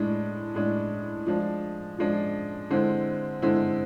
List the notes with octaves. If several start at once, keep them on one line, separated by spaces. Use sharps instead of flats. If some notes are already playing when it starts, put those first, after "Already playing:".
Already playing: A2 G#3 D4
A2 G#3 D4
F3 G#3 D4
F3 G#3 D4
D3 G#3 C4 E4
D3 G#3 C4 E4